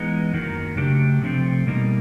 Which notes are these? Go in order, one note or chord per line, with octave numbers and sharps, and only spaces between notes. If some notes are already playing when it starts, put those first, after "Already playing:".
Already playing: E3 G#3 B3 D#4
F#2 D#3 F#3 A#3
C#3 F#3 A3 D4 G4
C3 F3 A3 C4
B2 G3 A#3 D#4